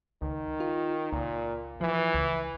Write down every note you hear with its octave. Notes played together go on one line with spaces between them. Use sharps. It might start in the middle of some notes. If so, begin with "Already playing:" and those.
C#2 D#3
F4
C#2 A#2
E3 F3
C#2